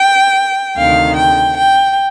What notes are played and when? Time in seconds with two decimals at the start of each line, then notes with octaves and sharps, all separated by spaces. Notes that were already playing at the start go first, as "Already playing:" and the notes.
Already playing: G5
0.78 D2 C3 D#3 F5
1.17 G5
1.57 G5